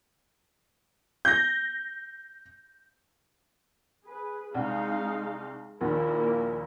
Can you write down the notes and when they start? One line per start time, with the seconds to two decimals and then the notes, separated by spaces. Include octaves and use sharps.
1.25 G6 A#6
4.05 G#4 B4
4.54 C2 G#3 D#4 F5
5.81 A#1 D#2 A#2 D#3 A#3 E4 A#4